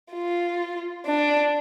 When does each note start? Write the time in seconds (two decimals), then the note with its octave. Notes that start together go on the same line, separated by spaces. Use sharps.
0.13 F4
1.07 D4